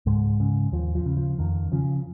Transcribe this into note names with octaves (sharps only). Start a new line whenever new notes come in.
C#2 G#2 G#3
C#3
D#2 F3
F3
C#3
F3
F2 D#3
C#3 F3